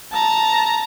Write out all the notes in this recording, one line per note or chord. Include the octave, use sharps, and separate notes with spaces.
A5 A#5